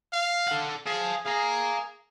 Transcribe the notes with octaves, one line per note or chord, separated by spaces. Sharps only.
F5
A4 F#5
G#4 F5 A5
G#4 F5 A#5